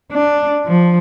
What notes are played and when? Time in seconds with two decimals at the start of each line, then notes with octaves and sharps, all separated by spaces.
0.12 D4
0.66 F3